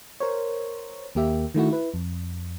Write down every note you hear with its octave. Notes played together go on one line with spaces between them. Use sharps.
A#4 C5 C#5
D#2 A#3 G4 E5
D#3 A3 E4 F#4
E4 B4
F2